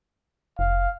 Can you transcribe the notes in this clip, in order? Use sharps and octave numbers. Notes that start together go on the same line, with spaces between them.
F1 F5